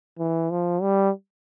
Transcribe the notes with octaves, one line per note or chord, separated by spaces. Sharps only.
E3
F3
G3